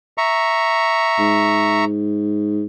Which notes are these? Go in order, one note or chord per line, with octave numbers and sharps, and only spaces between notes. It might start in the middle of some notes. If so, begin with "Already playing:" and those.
E5 A#5 C#6
G#2